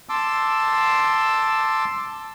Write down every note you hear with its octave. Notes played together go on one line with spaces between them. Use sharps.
A5 C6 D6 E6